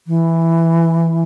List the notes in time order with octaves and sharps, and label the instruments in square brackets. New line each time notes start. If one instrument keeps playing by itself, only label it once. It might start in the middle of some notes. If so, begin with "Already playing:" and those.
[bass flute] E3